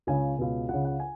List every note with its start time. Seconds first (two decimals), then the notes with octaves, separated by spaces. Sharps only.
0.07 C#2 C#3 G#5
0.38 C#2 B2
0.69 C#2 C#3 F#5
0.85 F#5
1.00 G#5